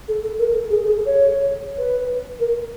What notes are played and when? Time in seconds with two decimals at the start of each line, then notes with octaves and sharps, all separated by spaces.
0.08 A4
0.24 A4
0.39 A#4
0.55 A4
0.70 G#4
0.86 G#4
0.96 A4
1.06 C#5
1.78 B4
2.40 A#4